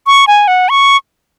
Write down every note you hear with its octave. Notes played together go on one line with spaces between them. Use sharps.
C#6
G#5
F#5
C#6